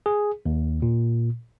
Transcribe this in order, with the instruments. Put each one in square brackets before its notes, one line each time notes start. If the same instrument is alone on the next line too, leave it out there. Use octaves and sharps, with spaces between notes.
[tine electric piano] G#4
D#2
A#2